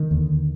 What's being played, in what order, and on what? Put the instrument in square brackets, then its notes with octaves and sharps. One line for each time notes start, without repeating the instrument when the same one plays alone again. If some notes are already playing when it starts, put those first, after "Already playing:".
Already playing: [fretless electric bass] D#3
D#2 D3